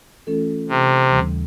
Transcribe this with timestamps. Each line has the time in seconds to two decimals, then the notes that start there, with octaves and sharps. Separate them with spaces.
0.27 E3 A3 C#4 F4 A4
0.69 C3
1.11 D#2 C#3 E3 G3